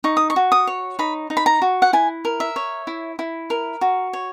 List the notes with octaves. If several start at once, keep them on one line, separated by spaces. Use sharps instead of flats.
D#4 C#6
D#6
C#6
F#4
D#6
C#5
D#4 B5
D#4
B5
A#5
F#4
F#5
E4 G#5
A#4
E5
C#5
E4
E4
A#4
F#4
C#5